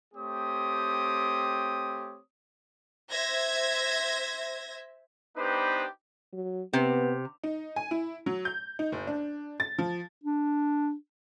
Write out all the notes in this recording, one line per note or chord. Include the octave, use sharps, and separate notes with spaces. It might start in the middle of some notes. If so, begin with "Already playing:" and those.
A3 C4 G4 C#5 D#6
C5 E5 G#6 A#6
B3 D4 D#4 G4 B4 C5
F#3
C3 B3
D#4
G#5
E4
F#3
G6
D#4
F#1
D4
A6
F3
D4